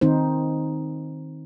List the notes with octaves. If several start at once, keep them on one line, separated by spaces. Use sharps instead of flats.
D#3 C4 D#4 C5